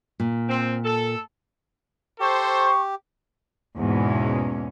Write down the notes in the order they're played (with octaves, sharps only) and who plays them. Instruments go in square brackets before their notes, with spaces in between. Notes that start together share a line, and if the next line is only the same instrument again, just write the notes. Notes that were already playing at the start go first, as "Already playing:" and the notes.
[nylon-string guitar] A#2
[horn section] C4
A4
[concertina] G4 [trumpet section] A4 C5 [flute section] C#6
[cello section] E2 G#2 B2 G#3 A#3 C#4